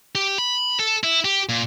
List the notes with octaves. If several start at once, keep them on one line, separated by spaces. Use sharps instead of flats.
G4
B5
A4
E4
G4
A#2